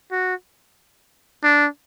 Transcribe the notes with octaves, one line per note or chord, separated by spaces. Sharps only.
F#4
D4